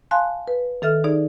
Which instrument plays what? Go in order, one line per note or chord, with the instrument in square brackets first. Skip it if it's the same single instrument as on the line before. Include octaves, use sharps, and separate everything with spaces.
[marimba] F5 G#5 A5 C6 F#6
B4
D#3 A4 E5 F6
D#4 G#4 D5